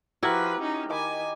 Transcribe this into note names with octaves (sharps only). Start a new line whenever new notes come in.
F3 E4 F#4 G4 A#4 B4
C#4 D#4
D#3 D#5 G#5 B5 D6